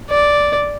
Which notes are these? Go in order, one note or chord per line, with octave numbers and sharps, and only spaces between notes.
D5